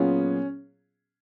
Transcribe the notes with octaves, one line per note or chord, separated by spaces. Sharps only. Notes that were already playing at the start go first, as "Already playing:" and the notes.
Already playing: A#2 F#3 B3 C#4 F4 G#4